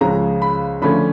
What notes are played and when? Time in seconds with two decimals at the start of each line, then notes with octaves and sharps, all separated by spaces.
0.01 C#2 C#3 F3 G#3 A#5
0.42 B5
0.82 D3 F3 A3 C#4 B5